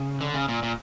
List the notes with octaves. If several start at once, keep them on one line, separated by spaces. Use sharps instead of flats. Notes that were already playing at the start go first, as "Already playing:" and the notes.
Already playing: C#3
D3
C#3
A#2
A#2